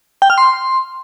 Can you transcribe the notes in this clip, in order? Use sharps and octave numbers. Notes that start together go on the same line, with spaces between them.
G5
F6
C6